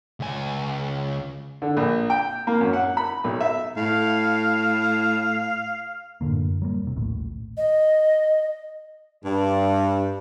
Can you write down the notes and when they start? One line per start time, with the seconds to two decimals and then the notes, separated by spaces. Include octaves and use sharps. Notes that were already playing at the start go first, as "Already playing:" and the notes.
0.20 C#2 G#5
1.62 D3
1.77 A#1
2.10 G5
2.47 A#3
2.61 F#2
2.73 F#5
2.97 B5
3.24 B1
3.41 E5
3.77 A2 F5
6.21 F#2 A2 D3 A#3
6.62 F#3 G3 A#3
6.83 E1 C3
6.97 A#1 D#2 A2
7.57 D#5
9.24 G2